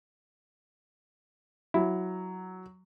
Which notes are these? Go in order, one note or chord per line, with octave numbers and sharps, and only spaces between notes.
F#3 E4